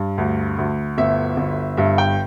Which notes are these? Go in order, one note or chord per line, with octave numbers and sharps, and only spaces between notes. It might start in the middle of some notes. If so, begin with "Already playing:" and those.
Already playing: G2
D2
D2
G1 E5
G1
G2 E5
G5